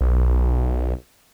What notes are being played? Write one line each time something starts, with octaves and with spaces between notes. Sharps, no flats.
B1